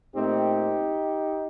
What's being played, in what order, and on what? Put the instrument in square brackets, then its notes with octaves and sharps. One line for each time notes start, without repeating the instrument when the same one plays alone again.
[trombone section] A#2 A3 C4 D#4 G4